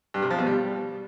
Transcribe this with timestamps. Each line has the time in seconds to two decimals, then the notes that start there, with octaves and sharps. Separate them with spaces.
0.14 G2
0.22 C3
0.30 F3
0.39 B2
0.47 G3